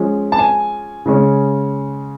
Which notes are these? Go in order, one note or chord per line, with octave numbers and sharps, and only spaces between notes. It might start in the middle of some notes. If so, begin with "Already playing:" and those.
Already playing: F3 G#3 C#4
A5
G#5
C#3 G#3 C#4